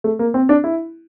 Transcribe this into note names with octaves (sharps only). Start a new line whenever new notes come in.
A3
A#3
C4
D4
E4